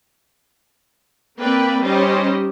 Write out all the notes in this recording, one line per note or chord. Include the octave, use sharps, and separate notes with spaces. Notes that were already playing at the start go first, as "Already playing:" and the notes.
A#3 C4 B4 D5 G5 B5
G3 C#4 D#4 G4 C5 D#5